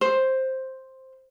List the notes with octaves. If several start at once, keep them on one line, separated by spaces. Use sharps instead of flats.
C5